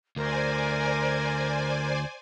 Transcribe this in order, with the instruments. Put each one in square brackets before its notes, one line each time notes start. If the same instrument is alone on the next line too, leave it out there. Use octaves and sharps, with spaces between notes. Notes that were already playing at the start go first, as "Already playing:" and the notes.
[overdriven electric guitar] D2 [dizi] A#4 [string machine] C5 D5 G#5